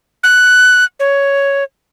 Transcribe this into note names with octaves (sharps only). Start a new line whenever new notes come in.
F#6
C#5